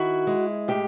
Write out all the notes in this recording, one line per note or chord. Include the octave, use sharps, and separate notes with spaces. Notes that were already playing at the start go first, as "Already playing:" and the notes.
Already playing: D#3 E4 F#4
G#3
A2 G4